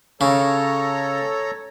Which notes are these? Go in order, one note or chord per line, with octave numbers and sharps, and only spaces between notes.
C#3 A4 C#5 A#5